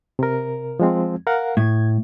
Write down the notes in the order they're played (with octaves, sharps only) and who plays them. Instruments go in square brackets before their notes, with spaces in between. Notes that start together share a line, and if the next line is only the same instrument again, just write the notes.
[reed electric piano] C3 A#4
F3 G#3 C4
A#4 F5 F#5
[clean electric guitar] A2 [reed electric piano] G#6